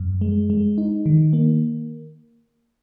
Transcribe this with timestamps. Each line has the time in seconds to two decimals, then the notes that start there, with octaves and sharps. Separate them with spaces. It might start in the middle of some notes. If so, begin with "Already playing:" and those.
Already playing: F#2
0.21 G#3
0.50 G#3
0.78 D#4
1.06 D#3
1.33 A#3